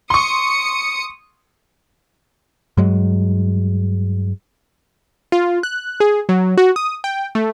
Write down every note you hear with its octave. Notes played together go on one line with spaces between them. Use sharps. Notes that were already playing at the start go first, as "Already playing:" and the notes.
C6 C#6 D#6 C#7
G2 F#3 G#3
F4
F#6
G#4
F#3
F#4
D#6
G5
A3